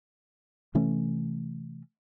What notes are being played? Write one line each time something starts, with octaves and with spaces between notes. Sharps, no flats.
C3 E3 A3 C#4